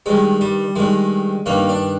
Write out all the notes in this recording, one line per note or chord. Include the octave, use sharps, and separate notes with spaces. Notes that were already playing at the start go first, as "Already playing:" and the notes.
G2 D#3 G#3
G3
G2 D#3 G#3
G2 D#3 A#3
D4